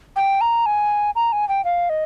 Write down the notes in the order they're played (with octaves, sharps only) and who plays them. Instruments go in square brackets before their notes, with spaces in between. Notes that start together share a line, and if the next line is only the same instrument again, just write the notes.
[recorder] G5
A#5
G#5
A#5
G#5
G5
F5
D#5